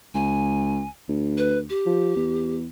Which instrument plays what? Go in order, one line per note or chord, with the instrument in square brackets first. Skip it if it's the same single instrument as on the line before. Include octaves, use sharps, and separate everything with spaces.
[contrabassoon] C#2 [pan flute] G#5
[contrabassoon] D2
[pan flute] B4
G4
[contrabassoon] F3
E2